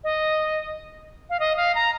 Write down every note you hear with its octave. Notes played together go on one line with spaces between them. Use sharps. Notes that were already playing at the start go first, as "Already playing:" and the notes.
D#5
F5
D#5
F5
A#5